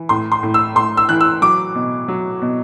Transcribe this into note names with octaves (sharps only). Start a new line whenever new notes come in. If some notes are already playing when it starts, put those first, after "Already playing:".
Already playing: E3
A2 C6
C6
A2
E6
A2 C6
E6
E3 F#6
E6
F#3 D6
B2
F#3
B2